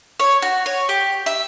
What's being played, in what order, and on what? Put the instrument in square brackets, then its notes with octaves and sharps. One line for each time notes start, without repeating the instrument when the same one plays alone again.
[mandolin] C#5
F#4
C#5
G4
E5